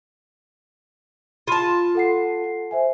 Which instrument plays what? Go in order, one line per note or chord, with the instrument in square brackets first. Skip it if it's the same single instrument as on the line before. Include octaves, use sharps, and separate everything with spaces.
[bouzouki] F4 A5 [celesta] B5
[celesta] A4 F#5 C7
C5 E5 G#5